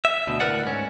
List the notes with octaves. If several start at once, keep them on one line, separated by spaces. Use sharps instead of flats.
E5
D2 B2
D2 A2 A#4 B4 D5 F#5
G#2 C#4